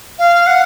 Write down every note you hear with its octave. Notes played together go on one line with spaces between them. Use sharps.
F5
F#5